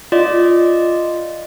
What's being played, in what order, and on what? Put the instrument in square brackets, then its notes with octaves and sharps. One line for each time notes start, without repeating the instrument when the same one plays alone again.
[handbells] F4 D5 D#5